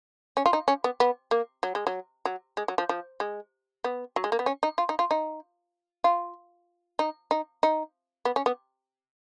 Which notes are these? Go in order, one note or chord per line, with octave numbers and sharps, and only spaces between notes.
C#4
F4
D#4
C#4
B3
B3
A#3
F#3
G#3
F#3
F#3
G#3
F#3
F3
F3
G#3
B3
F#3
G#3
A#3
B3
C#4
D#4
F4
D#4
F4
D#4
F4
D#4
D#4
D#4
B3
C#4
B3